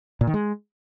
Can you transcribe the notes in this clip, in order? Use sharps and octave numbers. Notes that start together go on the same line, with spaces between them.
A#2
D#3
G#3